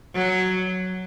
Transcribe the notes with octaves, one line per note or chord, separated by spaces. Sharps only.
F#3